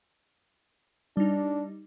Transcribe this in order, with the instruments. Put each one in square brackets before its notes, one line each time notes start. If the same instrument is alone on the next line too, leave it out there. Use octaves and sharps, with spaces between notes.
[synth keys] G3 D#4 [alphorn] D4